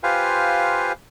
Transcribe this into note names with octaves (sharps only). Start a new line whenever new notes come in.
F4 G4 B4 C5 F5 G#5